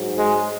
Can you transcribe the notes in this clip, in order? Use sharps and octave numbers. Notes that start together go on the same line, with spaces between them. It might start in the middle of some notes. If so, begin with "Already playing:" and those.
Already playing: G#2 F#3
G#3